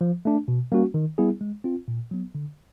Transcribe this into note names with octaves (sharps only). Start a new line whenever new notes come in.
F3
A3 D4
B2
G3 A#3 C#4 F#4
D#3
G3 B3 E4 G#4
G#3
C4 F4
A#2
F#3 B3
D3